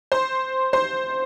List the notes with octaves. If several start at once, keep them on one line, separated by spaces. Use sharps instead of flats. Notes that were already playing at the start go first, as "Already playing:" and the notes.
C5 C6
C5 C6